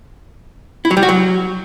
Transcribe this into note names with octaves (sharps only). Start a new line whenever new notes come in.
E4
F#3
G3
F#4
F#3